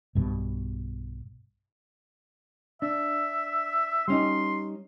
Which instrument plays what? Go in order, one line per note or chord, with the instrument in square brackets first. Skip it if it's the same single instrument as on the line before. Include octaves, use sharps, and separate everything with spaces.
[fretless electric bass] B1 G2 B2
[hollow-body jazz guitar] D4 [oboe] E5
[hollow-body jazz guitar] G3 C#4 D#4 [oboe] C6